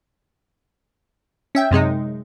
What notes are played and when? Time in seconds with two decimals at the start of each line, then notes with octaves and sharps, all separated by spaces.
1.55 C#4 E5 G5
1.71 F#2 C3 G#3 D#4